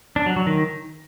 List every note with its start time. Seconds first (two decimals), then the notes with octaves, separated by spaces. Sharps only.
0.16 D4
0.26 F#3
0.36 F#3
0.47 D#3